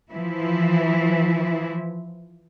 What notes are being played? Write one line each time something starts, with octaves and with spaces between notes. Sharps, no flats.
E3 F3 E4